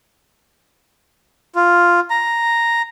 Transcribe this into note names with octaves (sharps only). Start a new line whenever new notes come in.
F4
A#5